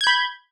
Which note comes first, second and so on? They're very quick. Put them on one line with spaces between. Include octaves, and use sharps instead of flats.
G#6 G6 B5